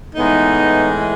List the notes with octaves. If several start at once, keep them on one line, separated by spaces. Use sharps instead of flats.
A2 E3 G#3 B3 D#4